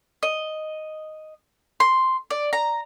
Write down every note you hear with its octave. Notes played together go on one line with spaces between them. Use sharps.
D#5
C6
D5
A#5